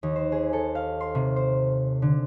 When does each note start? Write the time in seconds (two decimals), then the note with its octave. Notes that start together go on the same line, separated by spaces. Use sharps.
0.03 D#2
0.16 C5
0.32 G#4
0.53 A4
0.75 F5
1.01 C6
1.15 C3
1.36 C5
2.02 D3